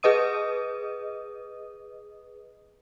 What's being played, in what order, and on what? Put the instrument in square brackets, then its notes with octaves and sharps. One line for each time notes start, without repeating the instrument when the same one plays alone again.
[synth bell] G#4 B4 D#5 D#6 D#7